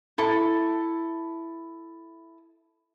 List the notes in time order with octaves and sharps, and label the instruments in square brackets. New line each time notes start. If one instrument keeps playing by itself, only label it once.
[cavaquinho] E4 A4 C#6